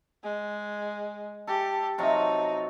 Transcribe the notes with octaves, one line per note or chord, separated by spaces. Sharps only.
G#3
G4 A4
C3 F#3 D#4 F4